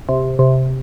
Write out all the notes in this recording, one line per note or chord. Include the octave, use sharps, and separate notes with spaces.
C3
C3